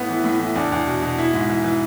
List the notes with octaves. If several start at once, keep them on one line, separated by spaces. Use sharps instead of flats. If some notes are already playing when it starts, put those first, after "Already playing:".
Already playing: A2 B3
E3
A2
E3
E2 D4
E2
B2
B2
E3 E4
G#2
E3
E3